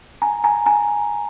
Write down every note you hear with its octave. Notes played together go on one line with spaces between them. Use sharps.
G#5 A#5
G#5 A#5
G#5 A#5